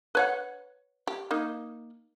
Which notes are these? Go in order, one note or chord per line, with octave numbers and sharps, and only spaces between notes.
B4 C#5 F#5
G4
A#3 D#4